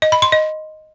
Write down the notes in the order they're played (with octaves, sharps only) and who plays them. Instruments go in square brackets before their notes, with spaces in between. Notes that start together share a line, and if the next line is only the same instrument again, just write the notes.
[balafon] D#5
B5
C6
D#5